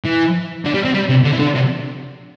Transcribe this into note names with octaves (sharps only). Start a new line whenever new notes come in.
E3
D3
G3
C4
G3
C3
D3
E3
D3
C3